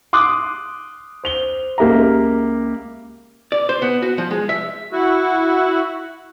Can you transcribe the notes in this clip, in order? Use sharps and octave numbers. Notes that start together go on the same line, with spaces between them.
C6 D6 D#6 F#6
C5 F7 G7
C#2 A#3 G4 E5 A#5
D5
C5
B3
F#4
F3
G#3
E5
E4 F#4